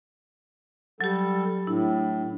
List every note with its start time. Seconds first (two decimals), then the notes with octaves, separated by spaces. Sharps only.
1.01 F#3 G3 G4 A4
1.67 A2 D4 E4